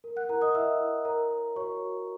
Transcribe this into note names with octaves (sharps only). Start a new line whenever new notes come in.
A#4
F#5 F#6
E4 A#4 A#5
D#5 D#6
E4 E5 E6
E4
A#4 C#5 A#5
C#5
F#4 C#5 C#6
F#4